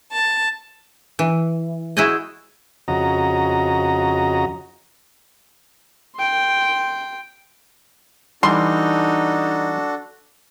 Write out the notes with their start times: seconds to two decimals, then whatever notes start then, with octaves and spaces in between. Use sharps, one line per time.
0.14 A5
1.19 E3
1.97 E4 F#4 G#4 C5 D#5
2.88 F2 C#3 F#4 D#5 A#5
6.16 G5 C6
8.43 E3 G3 D4 D#4 F#4 A4 C6